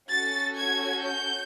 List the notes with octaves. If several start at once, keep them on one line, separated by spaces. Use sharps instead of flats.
C#4 F#4 A4 A6
G#6
G6